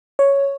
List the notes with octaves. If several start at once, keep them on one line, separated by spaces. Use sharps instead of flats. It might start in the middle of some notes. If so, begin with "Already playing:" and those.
C#5